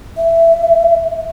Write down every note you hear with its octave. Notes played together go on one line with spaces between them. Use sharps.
E5